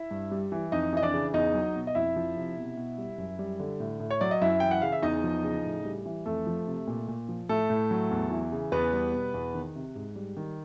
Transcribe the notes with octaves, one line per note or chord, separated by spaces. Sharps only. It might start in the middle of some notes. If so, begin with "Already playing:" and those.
Already playing: E4 E5
G2
G3
E3
F2 D#4 D#5
E3 D#5
D4 D5
C#3
E2 D#4 D#5
F#3
B2
D#5
F2 E4 E5
F3
C3
B2
B2
G3
F#2
G3
D3
A2
A2
C#5
F#3 D5
D#5
F#2 E4 E5
E3 G5
F#5
C#3 F5
E5
E2 D#4 D#5
F3
C#3
A2
G3
E3
F2 A3 A4
F3
C3
A#2
A#2
F3
A2 A3 A4
A2
F#3
E2
E3
C#3
E2 B3 B4
G3
B2
E2
D#3
C3
G#2
G3
D#3